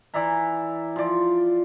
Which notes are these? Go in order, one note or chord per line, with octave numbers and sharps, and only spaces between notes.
E3 D5 E5 A#5
F3 D5